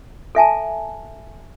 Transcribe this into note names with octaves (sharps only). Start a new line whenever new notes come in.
A4 E5 G#5 A5